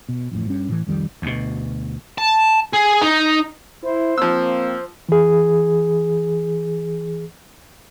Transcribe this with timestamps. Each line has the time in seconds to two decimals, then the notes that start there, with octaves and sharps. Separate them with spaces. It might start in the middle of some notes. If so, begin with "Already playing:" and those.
0.09 B2
0.31 A1 F2 A2
0.46 G2 C#4
0.69 A2 E3
0.86 C2 F2 D#3 G3
1.22 D2 B2
2.18 A5
2.73 G#4
3.01 D#4
3.83 E4 C5
4.18 F3 A#3 C4 E6
5.09 E3 G#4